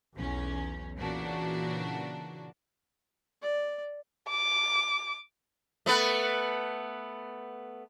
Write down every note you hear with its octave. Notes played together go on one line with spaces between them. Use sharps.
B1 E2 C#4
A#2 C#3 E3 D4 F#4
D5
D6
A3 B3 B4